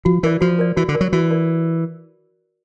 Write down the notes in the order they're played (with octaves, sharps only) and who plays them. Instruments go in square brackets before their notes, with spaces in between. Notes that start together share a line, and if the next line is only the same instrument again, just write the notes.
[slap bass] F3 [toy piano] F#4
[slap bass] E3 [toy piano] A#4 D5
[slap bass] F3 [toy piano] F#4
[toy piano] A#4 D5
[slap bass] E3 [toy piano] F#4
[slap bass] D3
[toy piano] A#4 D5
[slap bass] F#3
[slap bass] E3 [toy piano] F#4
[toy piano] A#4 D5